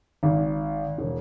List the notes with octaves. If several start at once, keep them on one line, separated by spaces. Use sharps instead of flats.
G#1
E1